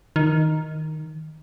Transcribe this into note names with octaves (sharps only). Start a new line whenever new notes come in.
D#3